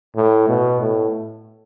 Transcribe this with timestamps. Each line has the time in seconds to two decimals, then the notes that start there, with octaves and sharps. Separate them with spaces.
0.16 A2
0.48 B2
0.80 A2